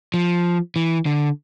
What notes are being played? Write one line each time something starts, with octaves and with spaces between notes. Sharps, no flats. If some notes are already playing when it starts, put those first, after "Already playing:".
F3
E3
D3